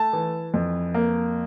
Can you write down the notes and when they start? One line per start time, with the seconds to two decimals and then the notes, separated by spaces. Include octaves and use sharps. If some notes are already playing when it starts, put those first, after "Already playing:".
Already playing: A3 A5
0.13 E3
0.54 F2
0.94 A#3